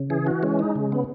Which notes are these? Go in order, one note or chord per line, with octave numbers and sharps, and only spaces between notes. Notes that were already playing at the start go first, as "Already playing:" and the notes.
Already playing: C#3
E3 G#4
F#4
G#3 C#4
D#4
C#3
B3